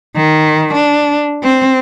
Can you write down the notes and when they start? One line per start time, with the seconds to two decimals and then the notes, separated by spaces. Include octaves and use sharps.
0.16 D#3
0.73 D4
1.43 C4